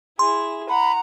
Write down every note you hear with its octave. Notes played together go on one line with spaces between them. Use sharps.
E4 G#4 C6
F#5 A#5 B5